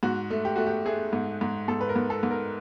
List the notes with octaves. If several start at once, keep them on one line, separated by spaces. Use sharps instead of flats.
G#2 F#4
A3
G4
A3 F#4
G4
A3 G#4
G#2
G#2
G#2 A4
B4
A#4
G#2
A4
G#2
A#4